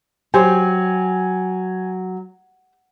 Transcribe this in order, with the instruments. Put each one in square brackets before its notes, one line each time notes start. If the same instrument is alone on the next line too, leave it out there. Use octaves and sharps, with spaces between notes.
[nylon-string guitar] F#3 [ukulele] G4 C5 [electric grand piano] G#5